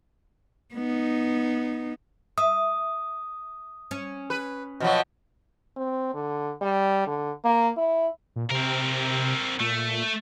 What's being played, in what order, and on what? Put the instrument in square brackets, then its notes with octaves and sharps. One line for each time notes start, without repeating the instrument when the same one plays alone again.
[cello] B3 D#4
[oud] E5 [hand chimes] D#6
[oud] C#4
[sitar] B4
B2 F3 F#3
[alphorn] C4
D3
G3
D3
A#3
E4
[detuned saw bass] A#2
[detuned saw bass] C3 [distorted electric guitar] C4 A#4
[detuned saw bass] A#2 [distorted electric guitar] A3